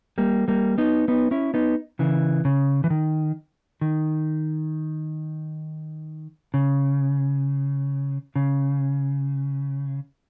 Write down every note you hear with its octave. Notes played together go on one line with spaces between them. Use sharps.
G3 A#3
G3 A#3
B3 D#4
B3 D#4
C#4 E4
B3 D#4
C#3 E3
C#3
E3
D#3
D#3
C#3
C#3